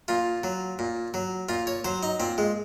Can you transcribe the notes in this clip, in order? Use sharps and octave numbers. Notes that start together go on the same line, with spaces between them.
A#2 F4
F#3
A#2
F#3
A#2 F4
C#5
F#3 C5
D#4
A#2 C4
G#3